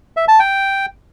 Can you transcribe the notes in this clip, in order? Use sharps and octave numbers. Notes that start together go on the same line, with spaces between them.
E5
A5
G5